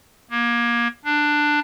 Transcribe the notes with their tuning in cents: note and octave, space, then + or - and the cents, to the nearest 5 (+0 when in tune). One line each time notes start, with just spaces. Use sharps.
A#3 +25
D4 +10